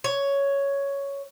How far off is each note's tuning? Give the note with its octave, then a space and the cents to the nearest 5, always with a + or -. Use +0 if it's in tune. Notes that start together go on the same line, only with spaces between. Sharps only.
C#5 +5